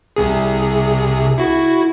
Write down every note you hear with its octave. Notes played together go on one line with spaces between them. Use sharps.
C2 C3 G#4
E4 F#4